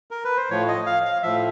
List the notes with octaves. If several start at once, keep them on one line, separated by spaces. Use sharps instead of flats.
A#4
B4
C5
A2 F3 C#5
D#5
F5
F5
A2 F3 E5